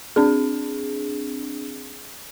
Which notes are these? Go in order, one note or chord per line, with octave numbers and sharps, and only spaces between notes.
C4 D4 G#4